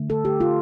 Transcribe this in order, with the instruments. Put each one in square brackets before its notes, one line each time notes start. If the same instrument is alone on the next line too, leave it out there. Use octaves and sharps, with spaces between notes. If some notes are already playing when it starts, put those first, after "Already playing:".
Already playing: [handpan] D3 A3
A4
G4
F4